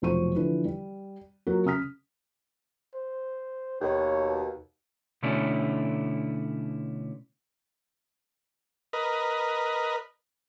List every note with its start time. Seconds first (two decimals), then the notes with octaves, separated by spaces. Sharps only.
0.02 F1 B1 F3 C5 C#6 D#7
0.35 D3 E3 F3 B4
0.65 G3
1.47 F#3 A#3 F4 F#4
1.65 C#3 D#6 F6 B6
2.94 C5
3.81 D#2 B2 C#5
5.23 B2 D3 A3 C#4 D4 E4
8.93 A#4 B4 D#5